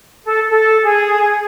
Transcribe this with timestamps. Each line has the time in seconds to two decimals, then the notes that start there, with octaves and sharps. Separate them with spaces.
0.25 A4
0.50 A4
0.84 G#4